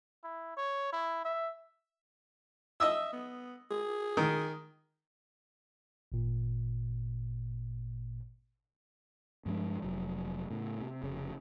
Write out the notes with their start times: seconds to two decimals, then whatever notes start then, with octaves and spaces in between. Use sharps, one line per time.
0.24 E4
0.57 C#5
0.93 E4
1.25 E5
2.80 D#5 E5 D#6 E6
3.13 B3
3.71 G#4
4.17 D#3
6.12 G#1 A#2
9.46 G2 F3 G#3 D4
9.82 F1 F#3
10.51 A2 C#3
10.80 C3
11.03 F1 C#3